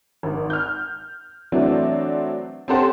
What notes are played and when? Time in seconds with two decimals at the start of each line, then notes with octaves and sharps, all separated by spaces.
0.23 G#1
0.50 F6 G6
1.52 E3 F#3 A3 C4 D4 F#4
2.68 C4 C#4 G4 A4 C5 F#5